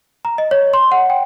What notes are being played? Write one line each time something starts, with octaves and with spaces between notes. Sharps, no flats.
A#5
D#5
C#5
C6
F#5
G5